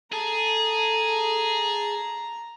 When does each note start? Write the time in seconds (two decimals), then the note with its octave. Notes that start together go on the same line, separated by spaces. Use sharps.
0.13 G#4 A4 A5 A#5